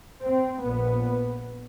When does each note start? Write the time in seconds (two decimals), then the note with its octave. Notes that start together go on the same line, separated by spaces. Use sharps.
0.25 C4
0.65 A#1 A#2 B3